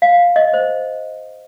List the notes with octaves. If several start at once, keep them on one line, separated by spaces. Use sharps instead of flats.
F5
D#5
C5